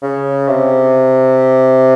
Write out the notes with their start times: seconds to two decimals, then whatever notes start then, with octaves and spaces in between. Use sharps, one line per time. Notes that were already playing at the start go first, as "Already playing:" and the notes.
0.03 C#3
0.48 C3